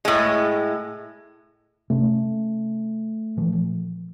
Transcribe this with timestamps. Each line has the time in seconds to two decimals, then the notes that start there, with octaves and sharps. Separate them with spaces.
0.05 A2 G#3
1.90 C3 A3 C#4
3.37 A#2 E3 F3